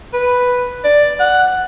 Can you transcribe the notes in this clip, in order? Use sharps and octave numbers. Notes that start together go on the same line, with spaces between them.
B4
D5
F#5